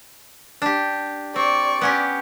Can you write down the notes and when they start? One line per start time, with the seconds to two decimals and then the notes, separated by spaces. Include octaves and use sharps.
0.62 D4 G4
1.36 C4 D5 C#6
1.81 B3 C#4 G4